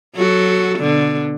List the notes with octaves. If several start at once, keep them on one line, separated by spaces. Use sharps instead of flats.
F#3 F#4 A4
B2 D3